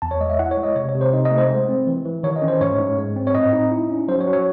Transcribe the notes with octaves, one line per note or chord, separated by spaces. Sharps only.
E2 A5
C#5
G#3 D#5
E5
E4 F#5
C#5
G#3
D#5
C3 C#5
C#5
C3
C5
D#4 D#5
D#5
A3
C5
G#3
C4
E3
E3
D#3 C#5
D#5
C#4
C5
G#2 C#5
G#2
G#3
C4
C#5
A2 D#5
D#4
E4
C#4
F#3 C5
C#5
F#3
C#5